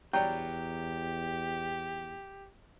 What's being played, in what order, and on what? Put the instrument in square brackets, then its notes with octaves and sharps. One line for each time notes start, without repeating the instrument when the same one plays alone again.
[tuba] E2 [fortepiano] F#3 G3 D4 [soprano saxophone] G4 [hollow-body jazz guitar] G5